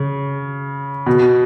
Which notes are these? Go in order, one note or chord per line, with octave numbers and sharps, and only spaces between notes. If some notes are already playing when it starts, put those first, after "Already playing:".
Already playing: C#3
B2